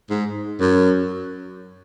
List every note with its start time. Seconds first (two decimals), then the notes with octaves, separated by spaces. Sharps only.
0.10 G#2
0.60 F#2